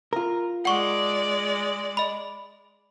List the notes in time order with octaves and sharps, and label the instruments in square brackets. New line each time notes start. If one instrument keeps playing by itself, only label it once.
[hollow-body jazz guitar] F4 A#4
[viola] G#3 D5 [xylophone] F#5 C#6
[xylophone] D#5 B5